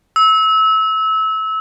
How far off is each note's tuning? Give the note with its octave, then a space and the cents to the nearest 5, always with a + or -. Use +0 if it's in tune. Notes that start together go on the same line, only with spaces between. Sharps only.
E6 -25